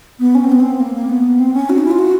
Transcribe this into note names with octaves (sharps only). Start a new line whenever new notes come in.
B3
C#4
C4
B3
C4
A#3
A#3
B3
C4
C#4
F#4
D#4
E4
F4
F#4